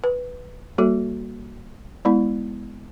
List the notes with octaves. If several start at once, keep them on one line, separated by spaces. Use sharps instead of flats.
B4
G3 A#3 F#4 A4
G#3 B3 E4